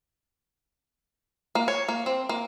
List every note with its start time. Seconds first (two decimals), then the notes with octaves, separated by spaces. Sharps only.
1.55 A#3
1.68 C#5
1.88 A#3
2.06 C4
2.29 A#3